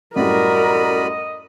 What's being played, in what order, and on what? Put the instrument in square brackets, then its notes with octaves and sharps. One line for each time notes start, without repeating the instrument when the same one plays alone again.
[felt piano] F#2 A2 G3 [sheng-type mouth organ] F#4 D5 B5 [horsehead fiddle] A#4 [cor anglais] D#5